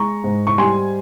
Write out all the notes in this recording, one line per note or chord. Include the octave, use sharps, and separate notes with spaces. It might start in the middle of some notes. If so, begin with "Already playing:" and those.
Already playing: G#3 A#5 C#6
G#2
C#6
G3 G#5 C6